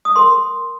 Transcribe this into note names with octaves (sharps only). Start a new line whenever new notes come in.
D#6
A#4 C6